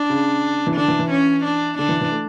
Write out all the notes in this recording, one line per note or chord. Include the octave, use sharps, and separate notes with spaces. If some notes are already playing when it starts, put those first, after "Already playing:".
Already playing: D4
C#3
E3
D3 D4
E3
E3
C#4
D4
D3 D4
E3
E3
A3